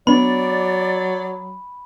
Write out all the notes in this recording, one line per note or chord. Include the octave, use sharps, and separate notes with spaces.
F#3 B3 D4 D5 B5